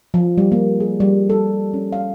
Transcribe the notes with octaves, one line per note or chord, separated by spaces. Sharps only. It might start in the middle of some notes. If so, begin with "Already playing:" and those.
F3
G3
A#3
G#4
G3
A4
C#4
F5